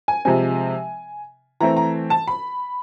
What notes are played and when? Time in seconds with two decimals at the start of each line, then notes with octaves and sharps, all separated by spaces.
0.08 G#5
0.25 C3 F3 G#3 C4 G#5
1.61 E3 A3 C4 A#5
1.77 A#5
2.10 A5
2.28 B5